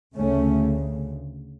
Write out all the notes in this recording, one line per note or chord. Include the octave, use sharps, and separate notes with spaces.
D2 C#3 A3 C#4